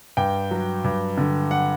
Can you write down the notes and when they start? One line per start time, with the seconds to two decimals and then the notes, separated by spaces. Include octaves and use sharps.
0.17 G2 G5
0.51 F#3
0.84 G2
1.18 D3
1.51 F#5